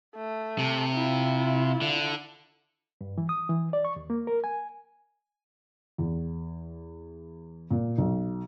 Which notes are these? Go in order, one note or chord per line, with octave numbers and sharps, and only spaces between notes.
A3
C3
E4 F4
D3
G2
E3
D#6
E3
D5
C#6
D#2
A#3
A#4
G#5
E2
A#2
B1